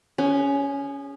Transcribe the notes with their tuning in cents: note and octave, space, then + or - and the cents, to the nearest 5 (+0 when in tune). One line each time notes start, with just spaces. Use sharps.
C#4 +15 G#4 -25